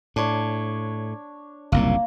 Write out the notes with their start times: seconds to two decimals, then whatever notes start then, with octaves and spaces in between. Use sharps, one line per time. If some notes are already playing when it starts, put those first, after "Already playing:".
0.16 A2 D4 C#5
1.72 F#1 C2 A#2 A#3